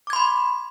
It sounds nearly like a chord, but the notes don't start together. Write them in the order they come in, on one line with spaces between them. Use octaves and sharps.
D6 G#6 C6 B5